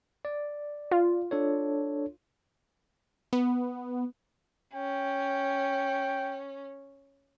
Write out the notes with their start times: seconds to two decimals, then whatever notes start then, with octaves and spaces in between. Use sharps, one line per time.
0.25 D5
0.91 F4
1.31 D4 A4 C#5
3.33 B3
4.74 C#4 G5